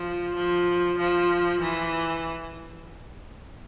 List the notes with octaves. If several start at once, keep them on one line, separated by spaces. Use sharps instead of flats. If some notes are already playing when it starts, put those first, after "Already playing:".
Already playing: F3
F3
F3
E3